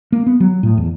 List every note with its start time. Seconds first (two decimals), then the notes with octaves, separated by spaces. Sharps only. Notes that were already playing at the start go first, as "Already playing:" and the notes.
0.12 A#3
0.26 B3
0.40 F#3
0.63 A2
0.77 E2